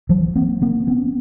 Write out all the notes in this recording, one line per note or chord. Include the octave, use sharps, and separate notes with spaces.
E3 F#3
A#3 C4
A#3 C4
B3 C#4